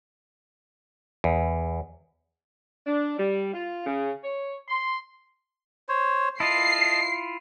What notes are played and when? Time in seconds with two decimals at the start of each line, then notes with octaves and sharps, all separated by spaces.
1.24 E2
2.86 D4
3.18 G3
3.53 F4
3.86 C#3
4.23 C#5
4.68 C6
5.89 C5 C#5
6.40 E4 F4 D#5 A5 C7